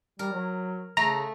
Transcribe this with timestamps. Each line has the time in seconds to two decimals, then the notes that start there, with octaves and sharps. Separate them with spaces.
0.19 G3 A#4
0.33 F#3
0.97 C#3 A3 A#5